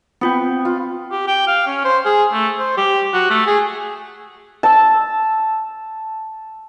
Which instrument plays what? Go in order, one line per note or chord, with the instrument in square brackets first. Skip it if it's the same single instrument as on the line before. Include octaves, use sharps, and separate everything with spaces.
[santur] B3 [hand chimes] C4 F4 G5
[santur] F4
[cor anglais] G4
G5
F5
C#4
C5
G#4
A3
C5
G4
F#4
A3
G#4
[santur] A5 E6